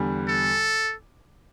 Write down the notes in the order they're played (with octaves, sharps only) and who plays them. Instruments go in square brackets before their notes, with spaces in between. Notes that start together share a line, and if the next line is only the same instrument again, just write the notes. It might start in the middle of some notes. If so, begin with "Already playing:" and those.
Already playing: [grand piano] E2 D3 G3
[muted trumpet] A4